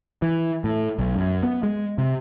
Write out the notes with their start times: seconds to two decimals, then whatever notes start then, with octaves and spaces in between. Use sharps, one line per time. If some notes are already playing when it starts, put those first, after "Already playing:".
0.22 E3
0.64 A2
0.99 B1
1.16 F#2
1.43 B3
1.63 G#3
1.98 C3